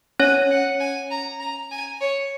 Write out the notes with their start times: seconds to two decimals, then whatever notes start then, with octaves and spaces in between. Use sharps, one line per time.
0.20 C#4 C#5 G#5
0.50 F#5
0.80 G#5
1.11 A#5
1.40 A#5
1.71 G#5
2.01 C#5